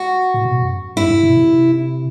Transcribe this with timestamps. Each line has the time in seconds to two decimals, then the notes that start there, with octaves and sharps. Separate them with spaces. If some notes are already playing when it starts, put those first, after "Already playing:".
Already playing: F#4
0.34 A2
0.45 B2
0.62 F#2
0.96 G2 E4
1.03 F#2
1.11 G2
1.23 B2
1.37 C3